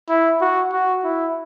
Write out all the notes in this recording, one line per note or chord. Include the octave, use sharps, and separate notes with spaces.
E4
F#4
F#4
E4